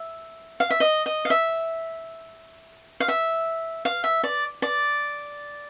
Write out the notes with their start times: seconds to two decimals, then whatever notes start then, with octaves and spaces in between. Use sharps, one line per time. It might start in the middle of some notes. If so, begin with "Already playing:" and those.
Already playing: E5
0.60 F5
0.70 E5
0.80 D#5
1.06 D#5
1.25 F5
1.30 E5
3.00 F5
3.08 E5
3.85 F5
4.04 E5
4.23 D5
4.62 D5